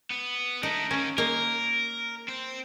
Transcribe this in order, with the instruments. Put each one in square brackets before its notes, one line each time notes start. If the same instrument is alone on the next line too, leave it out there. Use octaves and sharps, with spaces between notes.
[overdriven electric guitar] B3
[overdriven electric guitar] A3 D4 [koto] D#4
[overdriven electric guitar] D#3 A#3 [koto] C#4
[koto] A#3 D#4 [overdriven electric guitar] A#4
[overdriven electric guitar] C4